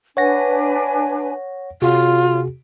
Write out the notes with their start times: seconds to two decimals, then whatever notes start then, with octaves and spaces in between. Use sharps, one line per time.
0.17 D4 B4 C#5 F#5 G#5 A#6
1.82 C3 F4 F#4 G#4 C#5